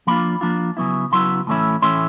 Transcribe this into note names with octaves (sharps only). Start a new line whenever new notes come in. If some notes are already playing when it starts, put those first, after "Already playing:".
F3 A#3 D4 F4 B5
F3 A#3 D4 F4
C#3 F#3 B3 E4
C#3 F#3 B3 E4 C6
A2 E3 A3 C#4 E4
A2 E3 A3 C#4 E4 C6